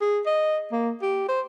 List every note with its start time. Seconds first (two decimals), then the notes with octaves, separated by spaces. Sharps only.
0.01 G#4
0.26 D#5
0.72 A#3
1.02 G4
1.29 C5